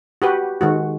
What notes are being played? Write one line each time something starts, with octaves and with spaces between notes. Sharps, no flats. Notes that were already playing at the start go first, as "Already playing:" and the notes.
F#4 G4 B4
D#3 G#3 F#4